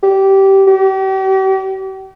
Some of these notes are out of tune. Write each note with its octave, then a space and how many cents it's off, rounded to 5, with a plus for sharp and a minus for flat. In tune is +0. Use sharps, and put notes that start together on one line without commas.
G4 -15
G4 -40